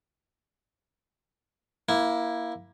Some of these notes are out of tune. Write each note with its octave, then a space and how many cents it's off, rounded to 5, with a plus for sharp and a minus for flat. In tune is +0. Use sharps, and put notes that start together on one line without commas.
A#3 +15 E4 +0